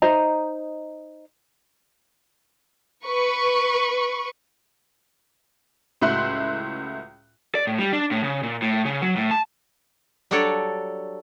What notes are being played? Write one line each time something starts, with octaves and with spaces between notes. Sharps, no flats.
D#4 C5 D#5 A#5
B4 C#6
C#2 A2 F#4 E5 C6 F#6
D5
A2
G3
D4
A2
C#3
A#2
A2
C#3
F#3
A2
A5
F#3 G3 D4 A4 C#5 D5